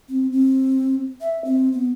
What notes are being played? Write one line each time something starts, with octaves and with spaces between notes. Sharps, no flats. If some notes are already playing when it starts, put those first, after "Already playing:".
C4
C4
E5
C4
B3